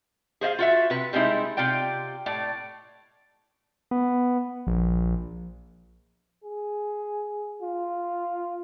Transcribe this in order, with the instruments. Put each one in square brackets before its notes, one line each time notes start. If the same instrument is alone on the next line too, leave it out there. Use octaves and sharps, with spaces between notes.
[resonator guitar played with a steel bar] G#4 C5 D#5 F5
F4 F#4 E5
C3 B4
G3 G#3 C4 D#4 E4
C3 F4 D5 G5
A2 D5
[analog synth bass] B3
A#1
[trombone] G#4
F4